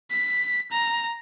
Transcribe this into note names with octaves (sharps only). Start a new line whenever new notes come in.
B6
A#5